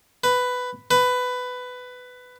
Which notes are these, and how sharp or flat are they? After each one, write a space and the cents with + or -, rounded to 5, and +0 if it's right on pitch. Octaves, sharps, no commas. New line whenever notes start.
B4 +10
B4 +15